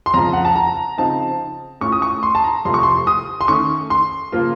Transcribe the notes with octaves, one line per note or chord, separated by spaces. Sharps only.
C6
F2 C#3 F3 A#5
F#5
A5
A#5
C#3 F3 C4 D#4 A5
A2 A3 C#4 F4 C#6
D#6
C#6
C6
A5
A#5
F2 C3 F3 A3 C6
C#6
C6
D#6
C6
D#3 A3 C#4 C#6
C6
C#3 F3 A#3 F4